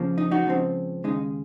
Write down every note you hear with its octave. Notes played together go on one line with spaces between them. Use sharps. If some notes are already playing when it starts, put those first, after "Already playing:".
Already playing: F2 C#3 F3 A#3
D#4
D#4 F#4
C#2 C#3 F3 C4
D#2 C#3 G#3 D#4